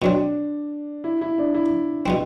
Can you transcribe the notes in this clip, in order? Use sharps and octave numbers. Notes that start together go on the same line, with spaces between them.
B2 F#3 C4 D4
E4
E4
D4
E4
B2 G3 C4